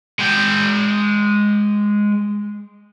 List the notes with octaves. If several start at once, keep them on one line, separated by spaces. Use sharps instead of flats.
G#3 G5